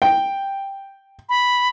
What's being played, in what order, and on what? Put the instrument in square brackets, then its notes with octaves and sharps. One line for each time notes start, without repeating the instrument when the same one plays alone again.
[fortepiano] G5
[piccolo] B5